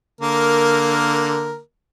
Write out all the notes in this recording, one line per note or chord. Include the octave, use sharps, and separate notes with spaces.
D3 A#3 A#4